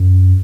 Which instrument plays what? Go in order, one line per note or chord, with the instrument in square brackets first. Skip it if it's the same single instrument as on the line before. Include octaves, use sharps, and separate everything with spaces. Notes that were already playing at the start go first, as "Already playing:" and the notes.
Already playing: [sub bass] F#2